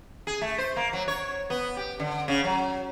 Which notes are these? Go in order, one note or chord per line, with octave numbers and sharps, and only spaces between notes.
G#4
A3
C5
A#3
F#3
C#5
B3
G4
D3
C#3
F#3